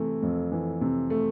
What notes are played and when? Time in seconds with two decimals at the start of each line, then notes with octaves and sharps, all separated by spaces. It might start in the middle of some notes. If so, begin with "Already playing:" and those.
Already playing: C3 E3 A3
0.23 F2
0.52 E3
0.81 C3
1.10 A3